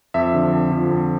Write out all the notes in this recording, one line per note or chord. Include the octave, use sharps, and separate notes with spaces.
F2 E5
D3 F3
F2
D3 F3
F2